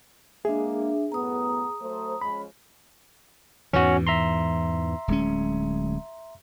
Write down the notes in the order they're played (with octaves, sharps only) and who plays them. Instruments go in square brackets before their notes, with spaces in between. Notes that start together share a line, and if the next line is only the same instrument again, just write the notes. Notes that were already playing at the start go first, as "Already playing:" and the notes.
[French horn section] G#3 A#3 [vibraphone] D4 E5 [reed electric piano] G#4
[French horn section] F#2 A2 B3 [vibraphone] A#5 D#6
[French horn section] F#3 A3 C5
[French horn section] F3 G#3 C#4 [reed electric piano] B5
[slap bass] E2 G#2 E3 [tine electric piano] C#4 F#4
[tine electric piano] E5 A#5 C6
[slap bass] D1 G#3 C#4